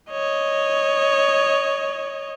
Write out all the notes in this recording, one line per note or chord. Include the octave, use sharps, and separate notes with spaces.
C#5 D#5